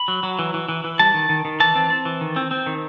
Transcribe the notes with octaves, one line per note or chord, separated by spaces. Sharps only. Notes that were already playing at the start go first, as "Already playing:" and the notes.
Already playing: B5
F#3
F#3
E3
E3
E3
E3
G3 A5
D#3
D#3
D#3
E3 A5
C4
C4
E3
D#3
C4
C4
D#3